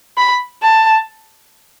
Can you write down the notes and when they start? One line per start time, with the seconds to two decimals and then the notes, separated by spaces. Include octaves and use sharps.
0.18 B5
0.63 A5